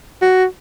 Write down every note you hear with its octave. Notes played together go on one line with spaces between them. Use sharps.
F#4